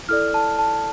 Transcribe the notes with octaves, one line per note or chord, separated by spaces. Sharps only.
E4 A4 D5 F6
A5
A5